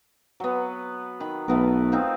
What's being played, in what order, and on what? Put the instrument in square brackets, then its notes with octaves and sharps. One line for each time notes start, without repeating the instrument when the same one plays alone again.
[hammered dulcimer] F#3 B3
D#3 B5
[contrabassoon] B1 [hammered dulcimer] A3 B3 A#4
[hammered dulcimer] C4 D#4 F4